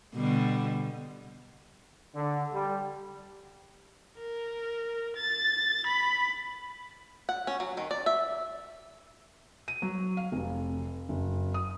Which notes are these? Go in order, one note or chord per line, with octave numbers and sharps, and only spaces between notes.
B2 D3 G3
D3
G3
A#4
A6
B5
F#5
C#4
F#3
D#3
D5
E5
D#7
F#3
F5
F1
F#1
D#6